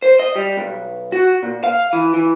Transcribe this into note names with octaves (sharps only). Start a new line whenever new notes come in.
C5
D#5
G3
B1
F#4
A#2
F5
E3
E3